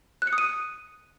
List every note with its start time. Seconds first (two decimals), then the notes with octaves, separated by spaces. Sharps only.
0.22 F#6
0.27 C#7
0.33 D#6
0.38 D#7